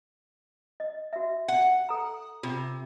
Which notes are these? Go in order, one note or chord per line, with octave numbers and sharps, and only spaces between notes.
D#5
F#4 E5
F#5
A4 A#5
C3 F4